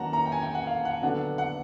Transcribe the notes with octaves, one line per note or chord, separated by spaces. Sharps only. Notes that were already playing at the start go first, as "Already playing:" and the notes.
Already playing: D#3 F#3 A#3 C#4 F#5 A5 A#5
A#5
G5
G#5
G5
F#5
F5
F#5
D3 F#3 B3 D4 F#5
F#5